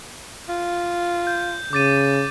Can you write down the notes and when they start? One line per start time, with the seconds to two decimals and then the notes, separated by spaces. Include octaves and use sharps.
0.49 F4
1.27 G6
1.73 C#3 D6 A6 D#7